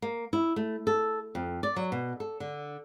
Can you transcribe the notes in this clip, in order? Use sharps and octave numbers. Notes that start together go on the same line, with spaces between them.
A#3
E4
A3
A4
F2
D5
F#3
B2
A4
D3